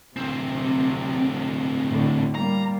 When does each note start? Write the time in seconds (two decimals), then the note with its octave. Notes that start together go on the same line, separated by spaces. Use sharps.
0.16 D2 C3 F#3 C4
1.89 A2 D3
2.35 G3 A#3 A#5